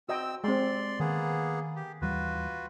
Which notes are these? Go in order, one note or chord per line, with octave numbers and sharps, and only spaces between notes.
C4 F#4 D#5 G5 E6
G#3 C4 D5 C6
D#3 A#3 B3 G#4
G4
D#2 E3 G3 F4 F#4 B4